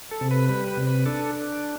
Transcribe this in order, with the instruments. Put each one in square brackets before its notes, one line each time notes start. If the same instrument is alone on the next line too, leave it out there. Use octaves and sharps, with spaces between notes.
[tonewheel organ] A4
C3
B4
G3 B4
B4
C3
B4
D4 A4